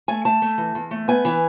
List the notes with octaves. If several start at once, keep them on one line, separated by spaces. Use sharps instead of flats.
A3 G#5
A3 A5
A3
E3
E2
A3
B3 G#5
E3